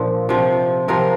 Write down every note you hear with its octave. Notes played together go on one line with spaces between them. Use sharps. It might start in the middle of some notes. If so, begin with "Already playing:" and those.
Already playing: A#2 F3 D4
C3 F3
C3 F3 A#4